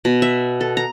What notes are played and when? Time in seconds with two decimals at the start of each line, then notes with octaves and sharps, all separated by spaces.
0.05 B2
0.22 E5
0.61 A4
0.77 A#5